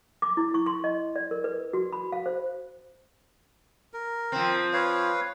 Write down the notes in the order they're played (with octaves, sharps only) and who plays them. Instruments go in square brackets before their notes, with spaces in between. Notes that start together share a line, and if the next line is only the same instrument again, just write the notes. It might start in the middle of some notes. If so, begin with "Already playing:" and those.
[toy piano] D6
E4
C#6
C6
D#5
D5
A#4
B4
F#4
B5
F5
C5
[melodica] A#4
[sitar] F3 C4
[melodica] B4 C#5 F5